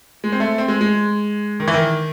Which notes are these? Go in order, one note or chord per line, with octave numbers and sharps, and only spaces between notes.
G#3
C4
A3
C4
G#3
G#3
D#3
E3
D#3